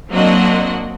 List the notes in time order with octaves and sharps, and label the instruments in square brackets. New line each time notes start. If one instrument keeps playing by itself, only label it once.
[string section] F#3 A#3 C4 D4 F#4 D#5